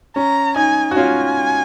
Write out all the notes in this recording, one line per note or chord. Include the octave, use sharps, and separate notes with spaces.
C#4 A#5
D#4 G#5
F#4
C#4 F4 G#5